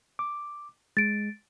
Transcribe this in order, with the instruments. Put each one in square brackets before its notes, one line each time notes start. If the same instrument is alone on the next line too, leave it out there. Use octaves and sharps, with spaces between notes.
[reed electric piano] D6
[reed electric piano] G#3 [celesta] A6 D7